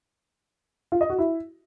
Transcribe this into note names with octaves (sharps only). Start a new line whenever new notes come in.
F4
D#5
F#4
E4